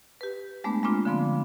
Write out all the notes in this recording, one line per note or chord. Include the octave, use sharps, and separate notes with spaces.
G4 B4
G#3 A3 B3 D4
G#3 A#3 C4 D4 F4
D3 F3 B3 C4